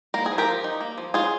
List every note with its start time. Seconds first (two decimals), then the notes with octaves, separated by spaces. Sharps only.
0.14 A#3 A#4
0.26 G#4
0.31 F3
0.38 G4 A#4
0.48 F3
0.64 D#4
0.80 A#3
0.98 F3
1.14 C#4 F4 G#4